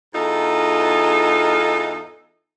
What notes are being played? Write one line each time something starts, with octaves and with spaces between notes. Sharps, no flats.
E2 G#2 D#4 F4 A4